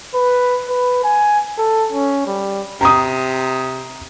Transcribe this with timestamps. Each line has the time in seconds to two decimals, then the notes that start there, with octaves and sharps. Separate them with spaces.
0.15 B4
0.69 B4
1.04 G#5
1.58 A4
1.92 C#4
2.27 G3
2.81 C3 A#5 D#6